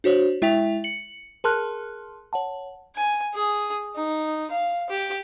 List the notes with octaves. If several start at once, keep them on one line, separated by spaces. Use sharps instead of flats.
D4 F#4 C5 C#5
G#3 E4 E5 G5 B6 F7
C#7 F#7
G#4 A#4 A5 C6 F6 F#6
C#5 F#5 A5
G#5
G#4
D#4
F5
G4